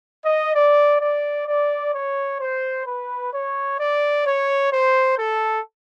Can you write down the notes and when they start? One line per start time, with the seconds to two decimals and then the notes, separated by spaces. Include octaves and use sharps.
0.24 D#5
0.54 D5
1.01 D5
1.48 D5
1.94 C#5
2.41 C5
2.87 B4
3.33 C#5
3.80 D5
4.26 C#5
4.72 C5
5.19 A4